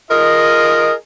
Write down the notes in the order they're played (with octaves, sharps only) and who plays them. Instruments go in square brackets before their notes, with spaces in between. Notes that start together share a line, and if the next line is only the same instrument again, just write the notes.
[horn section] F4 G#4 A#4 D#5